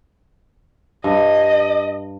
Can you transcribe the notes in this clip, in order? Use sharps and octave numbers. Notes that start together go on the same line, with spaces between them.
G2 D#5